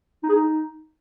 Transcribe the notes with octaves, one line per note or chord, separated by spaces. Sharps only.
D#4
G#4
D#4